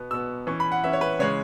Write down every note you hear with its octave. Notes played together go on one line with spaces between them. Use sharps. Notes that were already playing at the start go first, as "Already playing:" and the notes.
Already playing: B2 B3
B2 B3 E6
E3 C#4 C#6
B5
F#5
E3 C#4 E5
C#5
B4
C#3 E3 G#3 C#5